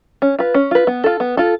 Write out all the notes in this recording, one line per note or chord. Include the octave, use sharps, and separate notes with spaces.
C#4
F4 B4
C#4
F4 B4
B3
F4 A4
B3
F4 A4